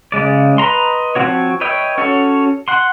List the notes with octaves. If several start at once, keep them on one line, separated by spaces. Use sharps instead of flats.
C#3 G#3 D5
B4 D#5 A#5 C6
F3 A3 C4 F#4 C#5
B4 C#5 D#5 E5 G5
C#4 F#4 A4 C#5
F#5 C6